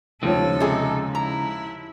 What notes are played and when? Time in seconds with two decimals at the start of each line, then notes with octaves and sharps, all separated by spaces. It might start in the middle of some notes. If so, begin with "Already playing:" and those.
0.23 D#2 C#3 F3 G#3 A4 C#5
0.60 C3 D#4 G#4
1.15 E4 A#5